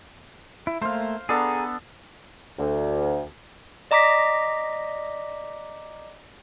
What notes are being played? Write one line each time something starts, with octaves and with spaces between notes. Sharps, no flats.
E4
A3 A#3 C5 F5
B3 D4 G#4 A4 A#5
D2
D5 D#5 A#5 D6 A#6 B6